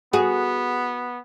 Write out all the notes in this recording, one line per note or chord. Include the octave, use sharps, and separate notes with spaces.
B3 F#4 G#4